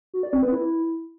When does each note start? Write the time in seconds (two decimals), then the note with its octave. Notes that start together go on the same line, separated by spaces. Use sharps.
0.14 F#4
0.23 D5
0.33 C4
0.43 B4
0.52 E4